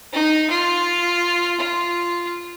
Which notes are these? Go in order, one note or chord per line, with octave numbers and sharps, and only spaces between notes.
D#4
F4
F4